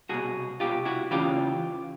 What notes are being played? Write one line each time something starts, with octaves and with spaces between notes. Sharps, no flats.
C2 B2 F#4 G#4
C2 B2 F4 G4
E4 F#4
E2 C#3 E3 F4 G4